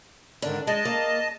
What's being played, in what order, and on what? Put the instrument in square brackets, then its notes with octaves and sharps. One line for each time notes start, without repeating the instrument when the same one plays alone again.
[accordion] G#2 D3 D#3 [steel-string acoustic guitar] D4
[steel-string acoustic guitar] G#3 [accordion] D#5 A5
[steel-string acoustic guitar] A#3